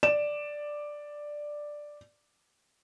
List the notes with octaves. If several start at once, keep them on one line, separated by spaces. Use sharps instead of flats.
D5 E7